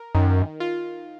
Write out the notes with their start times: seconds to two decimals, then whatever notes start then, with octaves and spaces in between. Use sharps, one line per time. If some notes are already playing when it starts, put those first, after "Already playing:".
Already playing: A#4
0.15 F#2 D#3
0.60 F4